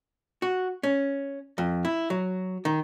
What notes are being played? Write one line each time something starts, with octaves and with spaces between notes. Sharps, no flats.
F#4
C#4
F2
E4
F#3
D#3